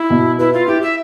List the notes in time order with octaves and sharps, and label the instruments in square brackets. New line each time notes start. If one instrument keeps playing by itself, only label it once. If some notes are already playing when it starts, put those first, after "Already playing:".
Already playing: [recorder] E4
[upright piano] B2
[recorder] E4 [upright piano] B4
[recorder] F4
[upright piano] E4 [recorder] G4
[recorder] E5